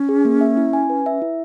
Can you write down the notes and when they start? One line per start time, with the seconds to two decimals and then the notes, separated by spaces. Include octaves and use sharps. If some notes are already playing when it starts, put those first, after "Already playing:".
Already playing: C#4
0.09 G#4
0.25 A#3
0.41 E5
0.57 E4
0.73 G#5
0.90 B4
1.06 E5
1.22 E4